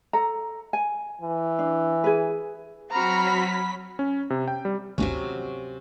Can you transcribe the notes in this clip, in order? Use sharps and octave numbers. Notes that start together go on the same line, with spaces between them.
A4 A#5
G#5
E3
D4
G#4 B4
F#3 C4 F#4 A#5 B5 F6 B6
C#4
C3
G5
G3
G#1 D2 G2 C3 F#3 C#4